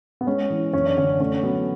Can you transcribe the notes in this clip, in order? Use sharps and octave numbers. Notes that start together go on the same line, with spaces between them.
B3
G#3 C#4
E3
F#1 C#4
D4
D3 C#4
A3 C#4
F#3 B3